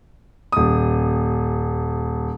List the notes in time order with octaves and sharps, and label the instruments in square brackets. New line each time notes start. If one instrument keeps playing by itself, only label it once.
[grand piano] D#1 D#6